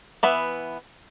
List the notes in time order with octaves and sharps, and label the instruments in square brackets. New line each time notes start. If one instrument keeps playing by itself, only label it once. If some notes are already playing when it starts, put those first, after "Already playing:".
[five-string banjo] E3 B3 E5